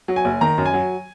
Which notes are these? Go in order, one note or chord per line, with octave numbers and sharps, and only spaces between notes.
F#3
G#5
F#1
D#3 A#5
F#2
G#5
F#3